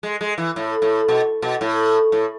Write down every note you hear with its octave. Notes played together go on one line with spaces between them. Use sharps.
G#3
G#3
E3
A2
A2
B2
B2
A2
A2